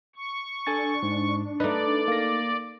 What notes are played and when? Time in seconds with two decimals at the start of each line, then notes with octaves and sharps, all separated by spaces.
0.16 C#6
0.67 D4 A4 G#5 A6
1.03 G#2
1.60 A3 D#4 B4 D5
2.08 A#3 A#6